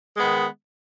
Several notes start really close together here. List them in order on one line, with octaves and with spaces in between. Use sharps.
G#3 B3 D#3